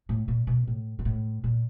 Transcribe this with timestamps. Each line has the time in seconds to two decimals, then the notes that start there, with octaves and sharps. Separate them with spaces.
0.09 A2
0.28 A#2
0.47 B2
0.67 A2
0.99 G#2
1.05 A2
1.44 A#2